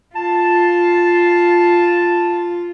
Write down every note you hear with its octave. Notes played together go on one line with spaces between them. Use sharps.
F4 A5